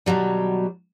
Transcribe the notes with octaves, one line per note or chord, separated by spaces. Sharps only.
B2 D#3 F#3 G3